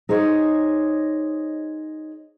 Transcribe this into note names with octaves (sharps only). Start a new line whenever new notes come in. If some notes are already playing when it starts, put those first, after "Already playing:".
D#4 G#4 C5 C#5 D#5